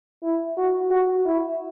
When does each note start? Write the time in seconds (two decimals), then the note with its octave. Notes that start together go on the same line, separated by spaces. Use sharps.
0.23 E4
0.57 F#4
0.91 F#4
1.25 E4